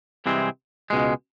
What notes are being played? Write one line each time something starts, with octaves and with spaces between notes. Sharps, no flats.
C2 C3 E3 G#3 C4
C#2 B2 G#3